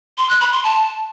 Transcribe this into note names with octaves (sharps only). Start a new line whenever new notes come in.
C6
F#6
B5
C6
A5